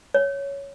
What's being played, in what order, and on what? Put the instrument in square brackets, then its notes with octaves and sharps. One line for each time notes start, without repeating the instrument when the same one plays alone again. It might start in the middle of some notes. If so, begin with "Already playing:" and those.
[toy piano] C#5